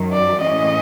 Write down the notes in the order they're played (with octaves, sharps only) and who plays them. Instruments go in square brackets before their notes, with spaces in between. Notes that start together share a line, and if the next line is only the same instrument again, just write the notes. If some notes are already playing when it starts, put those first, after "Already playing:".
Already playing: [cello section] F#2 D#3 F#3
[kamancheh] D5
[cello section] A2 E3 G#3 C#4 [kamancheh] D#5